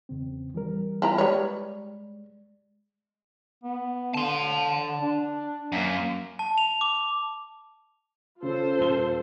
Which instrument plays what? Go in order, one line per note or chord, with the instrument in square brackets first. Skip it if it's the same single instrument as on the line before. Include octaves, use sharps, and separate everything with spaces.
[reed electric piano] E2 C#3 C4
E3 G3 A#4
[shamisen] F3 E4 A#5
[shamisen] G3 B4 C#5 [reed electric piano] G#3
[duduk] B3
[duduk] D3 [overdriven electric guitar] A5 C6
[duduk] D4
[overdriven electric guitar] F#2 [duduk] A#3
[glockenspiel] A5
F7
D6
[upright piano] C#3 [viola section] F4 A4 C5
[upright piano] D#1 G7